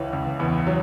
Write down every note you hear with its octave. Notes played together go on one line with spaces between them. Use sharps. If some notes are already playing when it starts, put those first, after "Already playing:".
Already playing: C#2 E3 B4 C#5
C#2
E2 B4
F#3